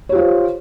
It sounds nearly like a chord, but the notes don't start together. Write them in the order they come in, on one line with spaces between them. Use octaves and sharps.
C#5 G4 F4 C5